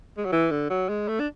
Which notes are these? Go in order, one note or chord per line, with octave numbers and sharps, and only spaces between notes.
G#3
F#3
E3
D3
F#3
G#3
A3
D4